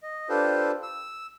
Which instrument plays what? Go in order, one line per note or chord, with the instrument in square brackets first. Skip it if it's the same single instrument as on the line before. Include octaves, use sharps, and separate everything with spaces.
[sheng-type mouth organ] D#5
D4 F4 G4 A4 B4 C5
E6